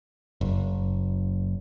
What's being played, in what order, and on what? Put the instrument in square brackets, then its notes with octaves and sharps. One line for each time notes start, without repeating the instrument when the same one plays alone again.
[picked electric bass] F#1